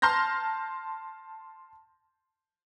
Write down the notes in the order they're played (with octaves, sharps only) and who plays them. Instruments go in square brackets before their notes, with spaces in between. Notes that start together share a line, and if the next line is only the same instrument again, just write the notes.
[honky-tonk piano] A5 C6 F6 G6 A#6